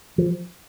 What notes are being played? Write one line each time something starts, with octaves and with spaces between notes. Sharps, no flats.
F3